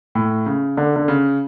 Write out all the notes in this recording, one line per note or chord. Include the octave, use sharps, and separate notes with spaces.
A2
C#3
D3
D3
C#3